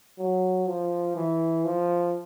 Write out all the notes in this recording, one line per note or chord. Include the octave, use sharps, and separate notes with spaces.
F#3
F3
E3
F3